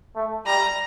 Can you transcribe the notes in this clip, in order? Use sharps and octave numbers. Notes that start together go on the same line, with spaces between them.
A3
G3 A#5